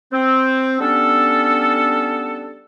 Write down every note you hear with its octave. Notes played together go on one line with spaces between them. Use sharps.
C4
G3 B3 C#4 D4 A4